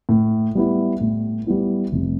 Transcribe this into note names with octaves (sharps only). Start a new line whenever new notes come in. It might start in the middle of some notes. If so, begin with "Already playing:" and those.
A2
G3 B3 E4
A2
G3 B3 E4
F1